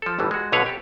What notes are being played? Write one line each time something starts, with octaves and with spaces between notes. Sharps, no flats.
F3 A4
G1 A2 E3 G3
G#3 F#4
B1 B2 D3 B4 C#5 F5
G4 A4